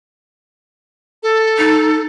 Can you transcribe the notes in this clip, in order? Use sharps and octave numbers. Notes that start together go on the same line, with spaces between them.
A4
D#4